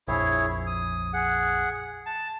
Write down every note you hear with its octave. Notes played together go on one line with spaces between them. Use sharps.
A#1 F2 E4 G#4 C#5
D#6
G#4 F#5
A5